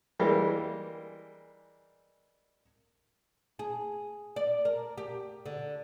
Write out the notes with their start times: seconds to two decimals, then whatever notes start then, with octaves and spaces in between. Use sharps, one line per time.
0.20 E3 G3 G#3 A#3
3.59 G#4
4.36 D5
4.65 A#4
4.98 G4
5.46 D3